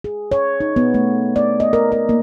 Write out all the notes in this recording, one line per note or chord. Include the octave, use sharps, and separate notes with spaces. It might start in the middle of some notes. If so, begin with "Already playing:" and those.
G#4
C#5
D#4
B3
A3
D5
D#5
A#4
A#4
A#3